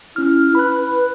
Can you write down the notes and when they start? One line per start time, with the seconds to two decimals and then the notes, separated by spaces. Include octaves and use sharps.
0.16 C#4 E4 F6
0.55 B4 B5 F#6